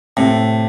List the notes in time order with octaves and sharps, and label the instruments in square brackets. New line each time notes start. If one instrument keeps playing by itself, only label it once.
[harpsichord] A2 [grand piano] C3